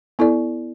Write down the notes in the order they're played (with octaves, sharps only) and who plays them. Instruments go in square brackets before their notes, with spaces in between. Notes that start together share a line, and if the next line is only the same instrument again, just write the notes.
[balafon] B3 E4 A4 D5